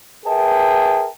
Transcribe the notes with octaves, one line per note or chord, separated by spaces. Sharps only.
G#4 A#4 B4 E5 G5 A5